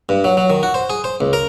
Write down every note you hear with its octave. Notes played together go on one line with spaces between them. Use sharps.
G2
F#3
F#3
D#3
F#4
C5
G#4
C5
C#2
A#4